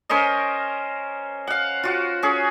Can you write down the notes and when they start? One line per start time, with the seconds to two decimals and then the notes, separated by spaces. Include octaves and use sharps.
0.09 C#4 A#4 C5 D#5
1.47 F5 F#5
1.83 F4 F#4
2.23 C#4 G#4